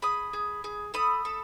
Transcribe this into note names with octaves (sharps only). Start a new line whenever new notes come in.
G#4 B5 D#6
G#4
G#4
A4 B5 D#6
A4